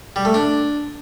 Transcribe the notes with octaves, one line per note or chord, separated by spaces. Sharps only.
G3
A3
D4